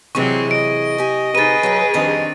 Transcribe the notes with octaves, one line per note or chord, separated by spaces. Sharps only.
C3 E3 F#3 G#3 C4 E4 C#6
D#5 D7
G4 G#5
C3 D#4 G#4 B4 A6 D#7
F#3 G5
F2 D#3 G3 C4 D4 D#5